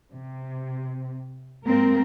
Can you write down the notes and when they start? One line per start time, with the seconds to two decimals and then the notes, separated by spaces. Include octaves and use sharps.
0.11 C3
1.66 G#2 A#3 C4 A#4